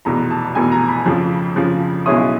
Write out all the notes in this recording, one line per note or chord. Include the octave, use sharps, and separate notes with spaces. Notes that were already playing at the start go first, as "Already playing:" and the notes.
F1 E2 B2 A#5
A5
F1 E2 B2 G#5
A#5
B5
F2 C#3 F3
F2 C#3 F3
B1 B2 G#3 C#4 E4 D#6